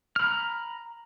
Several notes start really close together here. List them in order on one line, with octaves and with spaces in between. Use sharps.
F6 B5 A#5